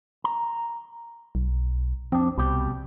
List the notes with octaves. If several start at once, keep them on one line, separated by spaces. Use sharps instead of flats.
A#5
B1
F2 C4 D4
C2 B2 G3 G4